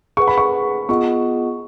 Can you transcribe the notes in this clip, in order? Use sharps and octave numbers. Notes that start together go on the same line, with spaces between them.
G#4 B4 F#5 C#6
B5
C#6
B3 F4 G#4 D#5 F#5 C#6